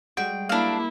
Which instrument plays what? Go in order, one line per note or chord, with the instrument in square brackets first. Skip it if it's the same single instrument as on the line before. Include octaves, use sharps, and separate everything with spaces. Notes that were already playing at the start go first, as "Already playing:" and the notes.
[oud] G3 G#3 F#4 [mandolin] G5
[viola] A#3 E4 [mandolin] D4 F5